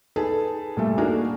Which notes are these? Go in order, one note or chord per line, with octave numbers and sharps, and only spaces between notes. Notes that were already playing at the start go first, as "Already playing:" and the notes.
D#4 G#4 A4 B4 A5
A#2 G3 A3
A#3 D4 D#4 F#4 G#4 A#4